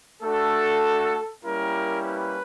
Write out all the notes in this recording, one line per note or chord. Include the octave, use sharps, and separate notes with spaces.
A3 D4 F#4 A4
G3 A#3 C#4 E4 G4 A#4
B4